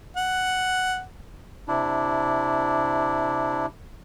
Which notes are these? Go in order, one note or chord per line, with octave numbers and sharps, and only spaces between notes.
F#5
C3 D4 E4